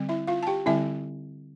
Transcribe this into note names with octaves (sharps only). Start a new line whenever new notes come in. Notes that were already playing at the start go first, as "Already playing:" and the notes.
Already playing: D3 G3 C4
E4 E5
F4 F5
A5
G4 G5
D3 G3 C4 E4 E5